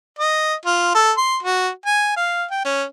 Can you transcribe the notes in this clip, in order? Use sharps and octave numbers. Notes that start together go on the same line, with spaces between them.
D#5
F4
A4
C6
F#4
G#5
F5
G5
C#4